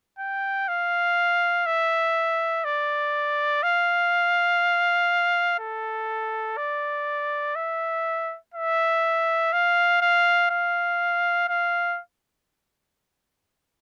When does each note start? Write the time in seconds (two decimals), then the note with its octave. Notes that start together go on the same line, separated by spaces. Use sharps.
0.19 G5
0.68 F5
1.66 E5
2.64 D5
3.63 F5
5.60 A4
6.57 D5
7.56 E5
8.54 E5
9.53 F5
10.01 F5
10.51 F5
11.49 F5